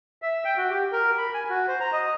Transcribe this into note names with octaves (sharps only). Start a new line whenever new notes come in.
E5
G5
F#4
G4
A#4
B5
G#5
F#4
C5
A#5
D#5